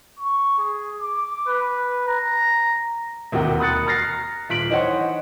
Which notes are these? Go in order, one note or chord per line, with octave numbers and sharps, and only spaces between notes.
C#6
G#4
D6
B4
A#5
E1 D#2 C3 F#4 A#4 G5
B5 D#6 F#6 A6 C#7
A#5 F6 A6 A#6 C7
D#1 F4 B6 D7 F#7
E3 D#4 C5 C#5 F#5